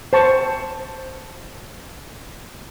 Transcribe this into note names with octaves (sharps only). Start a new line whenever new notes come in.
C5 A5 C#6